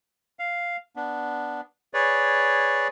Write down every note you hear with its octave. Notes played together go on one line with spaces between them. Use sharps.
F5
B3 D4
G#4 B4 C#5 D5